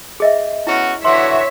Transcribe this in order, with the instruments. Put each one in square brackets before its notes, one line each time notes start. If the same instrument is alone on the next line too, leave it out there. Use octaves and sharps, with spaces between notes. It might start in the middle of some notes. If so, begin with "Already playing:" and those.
[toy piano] G#4 D#5 E5
[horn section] B3 C#4 F#4 [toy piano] E4
[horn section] D3 E3 F#4 [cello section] C#5 E5 [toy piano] C6